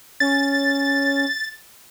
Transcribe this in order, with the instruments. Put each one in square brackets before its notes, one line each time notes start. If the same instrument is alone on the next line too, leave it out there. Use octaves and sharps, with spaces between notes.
[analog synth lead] C#4 [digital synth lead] A6